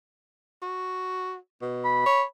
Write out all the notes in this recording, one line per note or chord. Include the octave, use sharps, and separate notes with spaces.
F#4
B2
B5
C#5